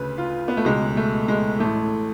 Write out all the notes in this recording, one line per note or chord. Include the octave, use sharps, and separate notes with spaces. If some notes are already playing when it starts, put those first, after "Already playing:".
Already playing: D2 C#3 B4
F4
B3
A3
C#2 B2 G#3
A3
G#3
A1 A2 A3